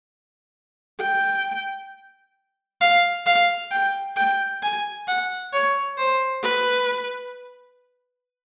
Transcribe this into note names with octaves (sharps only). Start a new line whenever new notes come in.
G5
F5
F5
G5
G5
G#5
F#5
C#5
C5
B4